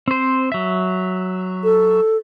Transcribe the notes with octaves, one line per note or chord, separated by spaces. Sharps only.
C4 C5
F#3 E5
A4